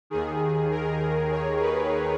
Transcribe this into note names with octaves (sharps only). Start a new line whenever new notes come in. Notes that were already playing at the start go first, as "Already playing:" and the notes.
D#2 D#3 G#4
A#4
C#5
B4